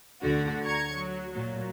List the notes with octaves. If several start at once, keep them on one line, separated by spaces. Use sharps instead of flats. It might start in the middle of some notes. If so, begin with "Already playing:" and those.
D2 D3 F#4
A#5 C#6 G#6
F#3
A#2 F#3